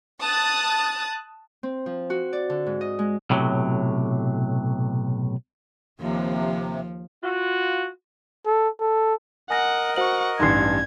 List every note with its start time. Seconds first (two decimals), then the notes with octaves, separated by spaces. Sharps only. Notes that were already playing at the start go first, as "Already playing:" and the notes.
0.21 A5 D#6 F#6 A6
1.63 C4
1.86 F3
2.10 F#4
2.33 D5
2.50 D3
2.66 G#2
2.81 D#5
2.99 G#3
3.30 B1 A2 C3 E3 F#3
6.00 D#2 C3 F3
7.23 F4 F#4
8.46 A4
8.80 A4
9.50 A#4 D#5 F#5 G#5 A#6
9.96 F#4 C5 F#5 C#6 F#7
10.40 A1 G2 D#4 C6 G#6 C7